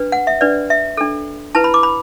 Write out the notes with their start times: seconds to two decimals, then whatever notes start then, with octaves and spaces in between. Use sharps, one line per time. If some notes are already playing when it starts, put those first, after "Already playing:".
Already playing: D4 B4
0.12 F#5
0.27 E5
0.41 D4 B4 D5
0.70 E5
0.97 D4 A4
1.55 E4 B4 A5
1.64 B5
1.74 D6
1.83 B5